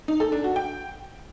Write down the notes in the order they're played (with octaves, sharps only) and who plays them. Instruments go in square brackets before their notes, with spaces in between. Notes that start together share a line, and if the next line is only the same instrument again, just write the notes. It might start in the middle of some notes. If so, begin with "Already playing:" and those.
[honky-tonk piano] D#4
A4
D4
F#4
G5